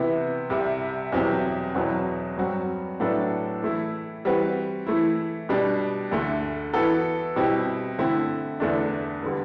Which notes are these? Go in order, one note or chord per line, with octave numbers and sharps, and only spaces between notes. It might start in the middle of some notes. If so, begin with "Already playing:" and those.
Already playing: C3 E3 B3
C2 C3 G3
E2 B2 F#3 C4 G4
E2 B2 F#3 C4 F#4
G2 F#3 C4 F#4
A2 F#3 B3 D4 A4
E3 A3 E4
E3 G3 C4 F#4 B4
E3 A3 E4
B2 G3 D4
D2 D3 A3
E3 B3 F#4 A4
B2 G3 C4 E4 G4
D3 A3 C4 E4
E2 D3 A3 D4
D3 G3 B3